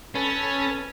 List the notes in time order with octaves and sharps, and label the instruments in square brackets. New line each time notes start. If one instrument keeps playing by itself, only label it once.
[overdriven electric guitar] C#4 [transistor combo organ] A4 B4